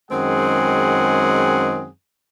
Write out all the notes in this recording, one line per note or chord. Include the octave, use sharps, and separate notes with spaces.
F#2 D#3 G#3 C4 G#4 F#5